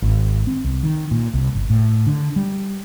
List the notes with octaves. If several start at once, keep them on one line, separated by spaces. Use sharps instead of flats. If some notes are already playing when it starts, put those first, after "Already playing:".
G#1
C4
C2
D#3
A#2
C2
G1
A2
D3
G3